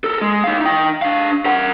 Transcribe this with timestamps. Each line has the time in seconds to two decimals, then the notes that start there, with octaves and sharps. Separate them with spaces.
0.04 A4 A#4
0.21 G#3
0.44 D#4 F5
0.61 D#4 G5
1.02 D4 F5
1.45 A#4 F#5